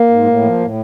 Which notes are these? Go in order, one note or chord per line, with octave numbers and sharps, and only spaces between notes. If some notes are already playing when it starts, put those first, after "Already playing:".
Already playing: A#3
G#2
A2
F3
A2